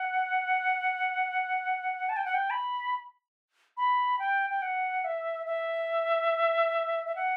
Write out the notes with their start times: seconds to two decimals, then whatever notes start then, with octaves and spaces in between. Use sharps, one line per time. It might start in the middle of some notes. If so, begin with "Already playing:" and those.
Already playing: F#5
2.09 A5
2.17 G5
2.25 F#5
2.34 G5
2.50 B5
3.77 B5
4.19 G5
4.50 G5
4.62 F#5
5.04 E5
5.46 E5
7.06 E5
7.16 F#5